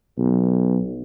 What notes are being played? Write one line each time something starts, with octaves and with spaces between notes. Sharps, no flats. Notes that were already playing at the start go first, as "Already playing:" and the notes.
B1